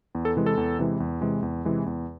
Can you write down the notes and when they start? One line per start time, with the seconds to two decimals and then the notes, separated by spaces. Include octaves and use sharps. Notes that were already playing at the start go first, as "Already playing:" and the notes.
0.15 E2
0.25 A4
0.36 C3 E3 G#3
0.46 A4
0.57 E2
0.79 C3 E3 G#3
1.00 E2
1.21 C3 E3 G#3
1.43 E2
1.65 C3 E3 G#3
1.86 E2